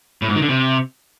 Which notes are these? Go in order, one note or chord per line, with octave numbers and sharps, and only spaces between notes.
A2
G#2
D#3
D3
C3